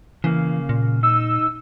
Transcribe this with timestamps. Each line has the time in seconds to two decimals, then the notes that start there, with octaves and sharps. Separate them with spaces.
0.24 C#3 E3 A#3
0.69 A#2
1.03 D#4 E6